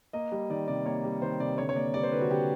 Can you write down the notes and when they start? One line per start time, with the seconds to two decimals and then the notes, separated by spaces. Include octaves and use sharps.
0.13 A#3 D#5
0.32 G3
0.50 D#3 D5
0.68 C3 D5
0.86 A#3 C#5
1.04 G3
1.22 D#3 C5
1.40 C3 D5
1.58 D3 C#5
1.69 C#5
1.76 A#3 D5
1.94 G3 D5
2.03 C5
2.12 D3 B4
2.21 F#4
2.30 D3 G4